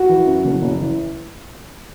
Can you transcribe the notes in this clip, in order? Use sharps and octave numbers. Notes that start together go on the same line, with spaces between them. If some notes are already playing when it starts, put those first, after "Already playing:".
Already playing: F#4
E3
F#2
F#1
F#1
E3